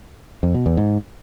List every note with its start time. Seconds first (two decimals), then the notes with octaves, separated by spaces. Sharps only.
0.43 F2
0.54 B2
0.66 E2
0.77 G#2